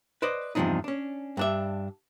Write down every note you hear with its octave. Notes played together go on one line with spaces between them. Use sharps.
B4 C5 D5 D#5
E2 G2 C3 F3 D4 D#4
C#4 D4
G2 D4 E5